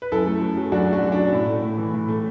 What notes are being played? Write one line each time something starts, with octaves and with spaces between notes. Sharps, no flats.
B4
F#2 E4 A4
A3
F#2
F#3
F#2 D4 F#4
A3
D4 F#4
F#2
D4
F#3
A2 E4
A3
A2
E3
A2
A3